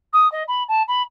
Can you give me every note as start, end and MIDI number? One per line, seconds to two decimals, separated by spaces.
0.13 0.30 87
0.32 0.43 75
0.48 0.63 83
0.68 0.82 81
0.88 1.02 83